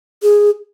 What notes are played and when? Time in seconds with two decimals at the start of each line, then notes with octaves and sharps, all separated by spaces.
0.23 G#4